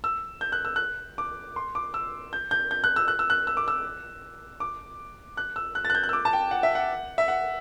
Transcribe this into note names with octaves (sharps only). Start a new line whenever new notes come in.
E6
G6
F#6
E6
F#6
D6
C6
D6
E6
G6
G6
G6
F#6
E6
F#6
E6
F#6
E6
D6
E6
D6
F#6
E6
F#6
A6
F#6
G6
F#6
E6
D6
A5
G5
F#5
E5
F#5
E5
F#5